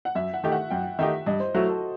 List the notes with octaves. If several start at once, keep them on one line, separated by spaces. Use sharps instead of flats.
F#5
F#2 E5
F#5
D#3 A3 D#4 G4
F#5
F#2 G5
D#3 A3 D#4 G4 E5
G2 D#5
C5
F#3 A3 E4 F#4
A4